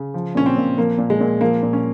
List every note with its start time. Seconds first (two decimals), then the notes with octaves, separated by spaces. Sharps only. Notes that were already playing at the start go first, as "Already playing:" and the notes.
Already playing: C#3
0.14 F3
0.35 A#2 C#4
0.46 C4
0.57 A#2
0.77 F3 A#3
0.98 A#2
1.10 G#3
1.20 A#2
1.41 F3 A#3
1.63 A#2
1.73 C#4